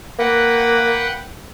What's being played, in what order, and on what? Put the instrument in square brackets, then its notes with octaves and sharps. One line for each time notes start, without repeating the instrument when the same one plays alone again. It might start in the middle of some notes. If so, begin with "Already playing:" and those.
[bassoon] A#3 [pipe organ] B4 F#5 G5